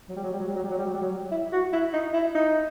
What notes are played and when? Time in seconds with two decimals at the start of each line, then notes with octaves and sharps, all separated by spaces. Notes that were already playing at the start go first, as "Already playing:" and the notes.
0.09 F#3
0.16 G3
0.24 F#3
0.33 G3
0.40 F#3
0.48 G3
0.56 F#3
0.64 G3
0.70 F#3
0.78 G3
0.86 F#3
0.95 G3
1.01 F#3
1.32 E4
1.52 F#4
1.73 E4
1.93 D#4
2.14 E4
2.35 D#4